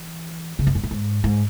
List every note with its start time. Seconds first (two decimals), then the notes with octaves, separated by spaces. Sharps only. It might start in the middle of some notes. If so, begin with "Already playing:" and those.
Already playing: E3
0.59 C#3
0.67 F#2
0.75 G#2
0.84 A2
0.91 G#2
1.24 G#2